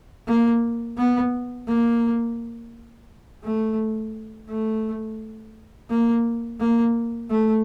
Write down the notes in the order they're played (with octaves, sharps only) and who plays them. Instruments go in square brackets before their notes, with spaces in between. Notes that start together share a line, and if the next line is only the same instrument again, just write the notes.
[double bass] A#3
B3
A#3
A3
A3
A#3
A#3
A3